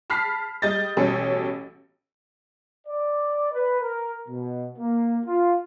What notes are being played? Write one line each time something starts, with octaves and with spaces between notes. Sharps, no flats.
A5 B5 F6 B6 C7
G3 D#5 G6 A6
A1 B2 G3 C#4 A4
D5
B4
A#4
B2
A#3
F4